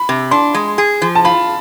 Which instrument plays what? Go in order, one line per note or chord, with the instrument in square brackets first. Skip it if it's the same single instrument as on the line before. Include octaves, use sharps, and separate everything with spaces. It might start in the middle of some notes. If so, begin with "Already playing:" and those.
Already playing: [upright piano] B5
[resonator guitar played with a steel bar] C3
[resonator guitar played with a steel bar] D4 [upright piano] C6
[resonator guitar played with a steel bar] G#3
G#4
F3
[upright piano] A5
[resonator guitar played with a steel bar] F4 [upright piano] B5